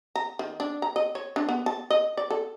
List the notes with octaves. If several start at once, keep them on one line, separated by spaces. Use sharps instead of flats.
A#5
D#3
D4
A#5
D#5
C#5
D4
B3
A5
D#5
D5
A4